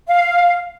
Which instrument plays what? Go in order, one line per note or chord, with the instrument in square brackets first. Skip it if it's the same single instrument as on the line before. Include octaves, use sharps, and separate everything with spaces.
[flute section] F5